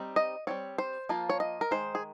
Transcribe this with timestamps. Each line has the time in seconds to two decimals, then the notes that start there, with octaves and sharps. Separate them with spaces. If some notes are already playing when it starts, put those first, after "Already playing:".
Already playing: G3 C4 D#4
0.16 D#5
0.47 G3 C4 F4 C#5
0.78 C5
1.09 F3 A#3 F4
1.30 C#5
1.40 D#5
1.61 A#4
1.71 D#3 G#3 C5
1.95 G#4